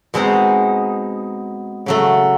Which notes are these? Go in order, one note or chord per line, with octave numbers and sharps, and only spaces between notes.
B2 G#3 C4 D#4
C#3 F#3 A3